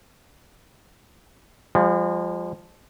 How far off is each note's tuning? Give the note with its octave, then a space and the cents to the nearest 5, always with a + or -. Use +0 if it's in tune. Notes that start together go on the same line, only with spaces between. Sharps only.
F3 +0 G#3 -45